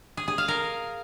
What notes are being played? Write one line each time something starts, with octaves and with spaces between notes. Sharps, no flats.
G#4
G#4
F5
A#4